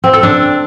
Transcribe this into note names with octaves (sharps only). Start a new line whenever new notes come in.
C4
A4
D4